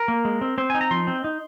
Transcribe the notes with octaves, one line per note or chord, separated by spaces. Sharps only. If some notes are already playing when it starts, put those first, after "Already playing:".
Already playing: A#4
A#3
G#3
C4
C4 C5
D#4 G#5
A#5
F3 C6
C4
D#4